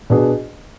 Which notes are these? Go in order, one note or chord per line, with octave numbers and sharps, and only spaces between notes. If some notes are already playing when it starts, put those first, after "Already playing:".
B2 B3 D4 G#4